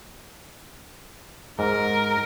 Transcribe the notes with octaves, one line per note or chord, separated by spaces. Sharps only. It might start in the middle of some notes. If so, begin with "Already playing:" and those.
G#2 A#4